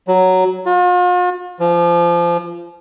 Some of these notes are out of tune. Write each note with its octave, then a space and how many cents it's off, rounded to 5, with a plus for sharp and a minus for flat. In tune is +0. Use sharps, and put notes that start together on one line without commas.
F#3 +5
F4 +45
F3 -25